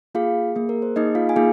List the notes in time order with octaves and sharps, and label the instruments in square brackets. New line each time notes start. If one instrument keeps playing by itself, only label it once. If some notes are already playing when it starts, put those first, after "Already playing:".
[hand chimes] A#3 F4 G#4 F5
A#3 G#4
A#4
C5
A#3 D#4 G#4 D#5
F4 F5
G#5
A#3 D#4 F4 G#4 F5